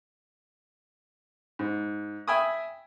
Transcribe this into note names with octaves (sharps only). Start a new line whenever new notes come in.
G#2
E5 G5 G#5 B5 D#6